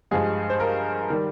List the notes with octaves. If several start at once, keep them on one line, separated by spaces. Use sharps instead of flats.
G2 F3 G#3 G#4
C5
A#4
D#3 G3